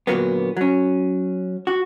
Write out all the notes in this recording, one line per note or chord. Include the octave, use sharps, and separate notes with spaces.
D2 A#2 F#3 A#3 B3
F#3 C#4
F#4